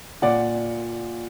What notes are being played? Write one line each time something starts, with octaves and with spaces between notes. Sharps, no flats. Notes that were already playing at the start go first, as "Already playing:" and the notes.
A#2 A#3 D5 F#5